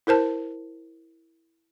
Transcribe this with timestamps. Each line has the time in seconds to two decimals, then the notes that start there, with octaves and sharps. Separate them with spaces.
0.07 E4 A#4 C5 A5